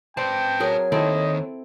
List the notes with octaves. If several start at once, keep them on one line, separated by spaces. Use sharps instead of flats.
C4 B4 C5 D5 G5 A5
F#3 G#4 A#4 C#5
D#2 D#3 C4 E4 A4 D#5